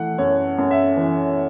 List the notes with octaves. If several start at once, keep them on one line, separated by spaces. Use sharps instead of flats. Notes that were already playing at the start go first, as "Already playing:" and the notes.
Already playing: E3 A3 F#5
F#2 C#5
F#2
E5
E3